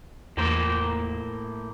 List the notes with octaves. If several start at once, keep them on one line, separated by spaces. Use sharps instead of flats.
E2 A2 A#3 C5